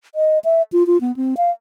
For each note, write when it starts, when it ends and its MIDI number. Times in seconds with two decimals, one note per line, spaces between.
0.15 0.39 75
0.45 0.62 76
0.72 0.86 65
0.87 1.00 65
1.01 1.15 59
1.16 1.35 60
1.37 1.50 77